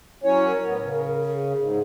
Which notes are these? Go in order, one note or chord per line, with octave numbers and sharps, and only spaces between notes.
F#3 C#4 E4 C#5
A#4
A2 B3
C#3
G#4
G#2